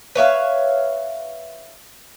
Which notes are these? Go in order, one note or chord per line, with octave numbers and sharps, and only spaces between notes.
B4 C#5 E5 F5